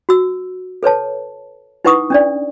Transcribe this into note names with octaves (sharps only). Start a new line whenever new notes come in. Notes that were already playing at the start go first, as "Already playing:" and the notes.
F#4 E6
A4 B4 C#5 A5
D#4 E4 B4 F#5 C#6 D#6
C#4 D4 D5